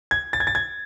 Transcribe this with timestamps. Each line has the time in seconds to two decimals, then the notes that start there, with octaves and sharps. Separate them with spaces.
0.11 G#6
0.33 A6
0.40 G#6
0.47 A6
0.55 G#6